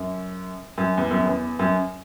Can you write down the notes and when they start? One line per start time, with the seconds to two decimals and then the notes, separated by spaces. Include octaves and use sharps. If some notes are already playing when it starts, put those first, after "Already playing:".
Already playing: F#2
0.78 F#2
0.98 E2
1.11 F#2
1.25 E2
1.59 F#2